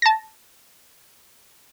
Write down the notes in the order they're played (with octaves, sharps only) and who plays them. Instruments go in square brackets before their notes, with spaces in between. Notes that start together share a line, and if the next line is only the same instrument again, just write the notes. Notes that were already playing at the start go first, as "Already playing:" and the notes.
[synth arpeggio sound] A5 A#6